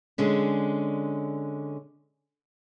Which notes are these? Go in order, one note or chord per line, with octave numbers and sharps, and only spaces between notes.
D3 G#3 C#4